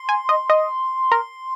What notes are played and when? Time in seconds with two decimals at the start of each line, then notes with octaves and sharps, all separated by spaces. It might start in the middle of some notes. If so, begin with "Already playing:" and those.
Already playing: C6
0.09 G#5
0.29 D#5
0.50 D#5
1.12 A#4